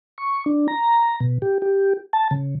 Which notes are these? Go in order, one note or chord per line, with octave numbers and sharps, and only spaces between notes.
C#6
D4
A#5
B2
G4
G4
A5
C#3